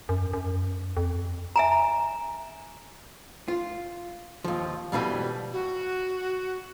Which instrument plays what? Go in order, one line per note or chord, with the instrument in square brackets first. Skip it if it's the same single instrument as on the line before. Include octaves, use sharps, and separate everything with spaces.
[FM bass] F#2
F#2
F2
[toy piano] E5 G#5 A#5
[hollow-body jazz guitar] F4
D#2 F3
F2 B2 E3 G3
[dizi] F#4